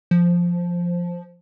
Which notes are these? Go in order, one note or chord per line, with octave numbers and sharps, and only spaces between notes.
F3